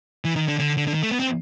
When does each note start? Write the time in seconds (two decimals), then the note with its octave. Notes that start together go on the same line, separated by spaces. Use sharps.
0.25 E3
0.36 D#3
0.48 D3
0.59 D3
0.77 D3
0.87 D3
0.94 D#3
1.03 A3
1.11 B3
1.20 C4